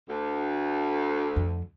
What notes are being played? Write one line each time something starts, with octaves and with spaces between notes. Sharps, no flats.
D2
F2